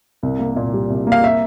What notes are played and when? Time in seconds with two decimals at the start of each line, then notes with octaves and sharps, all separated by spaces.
0.23 C2
0.39 A#3
0.56 A#2
0.73 G3
0.90 C2
1.07 A#3
1.12 F5
1.24 E5